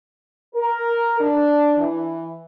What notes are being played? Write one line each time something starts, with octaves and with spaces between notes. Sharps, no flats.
A#4
D4
E3